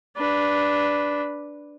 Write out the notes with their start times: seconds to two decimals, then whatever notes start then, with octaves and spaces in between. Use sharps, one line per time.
0.17 D4 B4